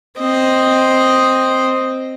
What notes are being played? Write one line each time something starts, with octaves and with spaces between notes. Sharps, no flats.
C4 D#5